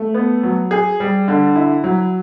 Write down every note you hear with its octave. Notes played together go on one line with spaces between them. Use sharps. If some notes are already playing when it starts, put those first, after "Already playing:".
Already playing: A3
B3
F#3
G#4
G3
D3
E4
F#3